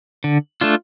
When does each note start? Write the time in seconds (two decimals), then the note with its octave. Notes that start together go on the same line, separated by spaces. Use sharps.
0.24 D3
0.61 A3 D4 F4